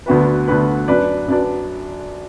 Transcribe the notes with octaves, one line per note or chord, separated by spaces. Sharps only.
D2 D3 B3 F#4 B4
D2 D3 B3 F#4 B4
F#2 F#3 D4 B4 D5
F#2 F#3 D4 B4 D5